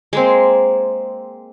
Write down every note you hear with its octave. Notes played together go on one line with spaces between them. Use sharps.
G#3 A#3 C4